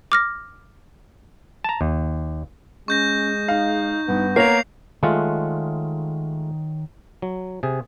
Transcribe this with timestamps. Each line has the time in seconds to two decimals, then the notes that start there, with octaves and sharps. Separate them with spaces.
0.12 D6 F6 A#6
1.64 A5 A#5
1.81 D#2
2.88 G#3 C#4 C#6 G6 A#6
3.48 D#4 F5
4.08 G2 B3
4.36 A#3 A#4 C#5 A#5 C7 F7
5.03 D#3 G#3 A3 F4 C#5 F#5
7.22 F#3
7.63 C3 G#4